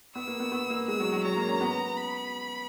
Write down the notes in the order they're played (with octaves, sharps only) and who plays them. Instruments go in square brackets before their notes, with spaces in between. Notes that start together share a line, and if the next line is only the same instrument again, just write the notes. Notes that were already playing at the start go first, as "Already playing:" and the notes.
[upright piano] B3 [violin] E6
[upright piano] A#3
B3
B3
A#3
[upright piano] G#3 [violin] E6
[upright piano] F#3
F#3
[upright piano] F#3 [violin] A#5
[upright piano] A#3
C#4
B3
[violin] B5